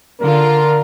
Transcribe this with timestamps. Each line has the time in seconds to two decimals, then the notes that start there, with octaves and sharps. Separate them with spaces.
0.20 D3 F4 A#4